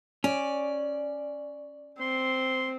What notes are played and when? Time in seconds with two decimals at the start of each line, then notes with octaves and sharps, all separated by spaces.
0.24 C#4 D5
2.00 C4 C6